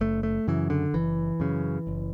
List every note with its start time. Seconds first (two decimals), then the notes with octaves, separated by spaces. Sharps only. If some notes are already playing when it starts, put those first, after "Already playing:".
0.01 F#1 A3
0.23 A3
0.48 F#2 C#3 E3
0.70 D3
0.94 F#1 E3
1.40 F#2 C#3
1.87 F#1